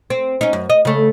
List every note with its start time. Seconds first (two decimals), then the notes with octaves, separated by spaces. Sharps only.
0.10 C4
0.41 C#4 D#4
0.53 F#2
0.70 D#5
0.85 C#3 A3